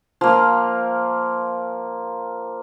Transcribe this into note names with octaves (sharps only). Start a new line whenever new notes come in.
F3 A#3